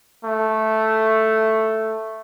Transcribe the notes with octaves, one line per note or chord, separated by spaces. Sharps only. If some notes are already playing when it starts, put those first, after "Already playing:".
A3